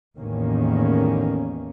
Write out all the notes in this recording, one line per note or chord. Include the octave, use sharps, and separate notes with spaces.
A1 E2 D#3 A#3 C#4